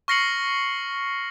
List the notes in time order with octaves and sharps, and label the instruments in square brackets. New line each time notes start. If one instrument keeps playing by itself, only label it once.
[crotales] C#6 F6 A#6 C7 C#7 F#7